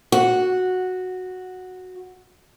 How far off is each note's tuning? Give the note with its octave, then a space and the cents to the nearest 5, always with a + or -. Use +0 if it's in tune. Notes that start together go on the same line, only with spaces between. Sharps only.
F#4 -5